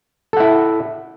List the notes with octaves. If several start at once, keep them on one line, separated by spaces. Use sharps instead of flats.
E4 A4 F#5